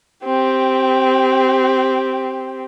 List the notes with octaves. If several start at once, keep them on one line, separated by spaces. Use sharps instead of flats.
C4 G4